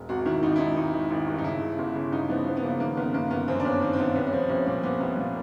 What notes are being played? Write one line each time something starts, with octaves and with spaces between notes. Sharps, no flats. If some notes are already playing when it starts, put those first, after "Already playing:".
Already playing: E1
G#1 F#4
D#3 E4
G#1 D#4
E4
G#1 D#4
G#1 D#4
D#3
G#1
G2
D#4
C#3 E4
C#3
G1
C#3
G1 D#4
F3 B3
F3 B3
B3
C#3 A#3
D#3 A#3
G1 B3
G1 A#3
G1 B3
F#2 C4
D4
G1 C#4
D#3 C4
C4
G1 B3
C2 B3
C#4
F3 C4
C2 C#4
A#2 C4
A#2 B3
C2 B3
A#2 A#3